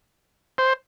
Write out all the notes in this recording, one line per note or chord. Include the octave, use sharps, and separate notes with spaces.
C5